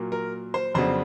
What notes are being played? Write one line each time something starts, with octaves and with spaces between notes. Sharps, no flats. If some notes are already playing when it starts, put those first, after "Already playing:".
Already playing: A#2 F#3 A#3
A#4
C5
F2 C#3 F#3 B3 D4 C5